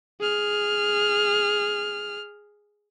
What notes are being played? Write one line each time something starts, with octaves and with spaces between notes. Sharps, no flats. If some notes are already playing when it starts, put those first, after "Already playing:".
G#4 F6